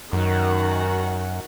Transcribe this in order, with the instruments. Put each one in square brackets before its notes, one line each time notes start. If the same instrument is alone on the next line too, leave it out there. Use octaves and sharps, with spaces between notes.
[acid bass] F#2 [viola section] D#3 F#4 F#5